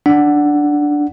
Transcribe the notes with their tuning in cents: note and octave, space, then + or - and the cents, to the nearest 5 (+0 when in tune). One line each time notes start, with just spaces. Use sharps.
D4 +0 F#5 +0